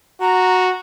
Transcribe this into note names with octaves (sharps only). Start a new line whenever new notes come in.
F#4 A#5